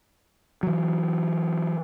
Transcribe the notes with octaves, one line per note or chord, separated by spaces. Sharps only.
E3 F#3